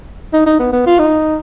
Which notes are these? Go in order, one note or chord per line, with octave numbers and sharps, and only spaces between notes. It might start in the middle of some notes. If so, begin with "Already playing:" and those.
D#4
D#4
B3
B3
F4
D#4